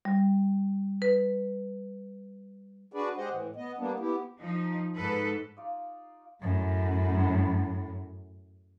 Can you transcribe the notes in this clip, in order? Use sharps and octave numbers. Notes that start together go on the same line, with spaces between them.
G3
B4
D4 F#4 G#4 B4 D5
G#3 G4 G#4 C5 D#5 F#5
A2 E3
B3 D#5
G3 A#3 B3 D4
B3 E4 G4
F3 D#4
G#2 A4 B4
D#4 F4 D5 F5
F#2 A2